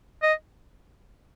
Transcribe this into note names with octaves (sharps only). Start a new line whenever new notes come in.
D#5